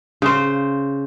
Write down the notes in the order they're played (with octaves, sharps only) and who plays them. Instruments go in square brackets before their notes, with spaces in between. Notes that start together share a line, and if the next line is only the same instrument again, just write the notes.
[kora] C#3 C5